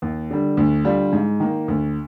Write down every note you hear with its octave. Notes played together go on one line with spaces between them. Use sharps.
D#2
D3 G3
D2
D3 G3 D4 F4
G#2
D#3 A#3
D2